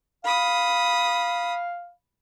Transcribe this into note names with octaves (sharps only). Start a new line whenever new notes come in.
F5 B5 D#6